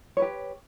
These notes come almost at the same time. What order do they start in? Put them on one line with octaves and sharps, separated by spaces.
C#5 B4 G4